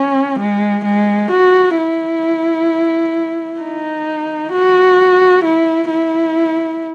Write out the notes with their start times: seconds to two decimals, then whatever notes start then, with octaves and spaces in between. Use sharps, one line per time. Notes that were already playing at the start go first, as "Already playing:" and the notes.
Already playing: C#4
0.39 G#3
0.85 G#3
1.31 F#4
1.77 E4
3.60 D#4
4.52 F#4
5.44 E4
5.90 E4